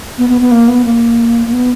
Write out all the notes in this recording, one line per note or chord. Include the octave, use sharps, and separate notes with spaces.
B3
B3
B3
A#3
B3
A#3
A#3
B3